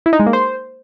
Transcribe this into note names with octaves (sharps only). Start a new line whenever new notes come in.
E4
D#4
G#3
A#3
C5